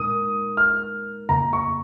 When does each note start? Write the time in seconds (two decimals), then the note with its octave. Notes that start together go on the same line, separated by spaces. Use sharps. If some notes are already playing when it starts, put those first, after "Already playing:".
Already playing: A#2 G#3 D#4 A#4 D#6
0.57 F6
1.29 F2 C#3 A#3 A#5
1.53 C#6